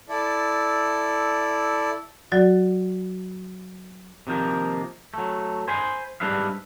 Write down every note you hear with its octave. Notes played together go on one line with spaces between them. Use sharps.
E4 A4 D5
F#3 F#4 D5
C3 D#3 F3 A#3
F#3 A3
C5 G#5 B5 C6
G#2 G3 D4 B4 E5 F5